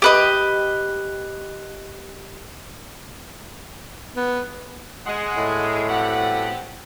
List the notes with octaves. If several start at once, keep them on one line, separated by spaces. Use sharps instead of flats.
G4 B4 D#5
B3
G#3 D#5 F#5
A2
B3 C4 F#4 G4 A4 F#5